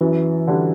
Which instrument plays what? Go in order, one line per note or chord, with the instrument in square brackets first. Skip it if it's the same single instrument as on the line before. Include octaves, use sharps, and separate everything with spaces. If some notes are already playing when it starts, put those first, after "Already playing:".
[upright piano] F#2 [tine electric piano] E3
[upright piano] D3 G3 D4